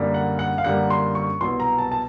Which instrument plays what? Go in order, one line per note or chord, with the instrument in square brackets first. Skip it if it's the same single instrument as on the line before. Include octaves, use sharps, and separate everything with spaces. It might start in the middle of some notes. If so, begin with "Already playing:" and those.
Already playing: [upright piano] F#2 D3 G3 A#3
F#5
F#5
F5
F#2 D3 G3 A#3 F#5
C6
C#6
C2 B2 F#3 C6
A#5
A5
A5